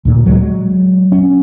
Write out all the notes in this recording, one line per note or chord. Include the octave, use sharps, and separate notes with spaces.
D2 A#2
F#3 G#3
C#4